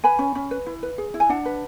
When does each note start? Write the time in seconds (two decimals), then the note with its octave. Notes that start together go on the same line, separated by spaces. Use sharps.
0.04 B4 G#5 B5
0.19 C#4
0.35 C#4
0.51 B4
0.66 E4
0.83 B4
0.98 G#4
1.14 E4
1.20 G#5
1.29 D4 F#5 A5
1.45 B4